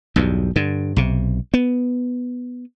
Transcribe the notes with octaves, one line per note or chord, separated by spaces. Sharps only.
B1 E2 G2
G2 D3
B1 C3
B3